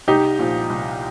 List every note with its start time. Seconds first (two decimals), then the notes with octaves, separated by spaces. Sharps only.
0.08 C2 D#4 G4
0.39 A#2 F3
0.70 C2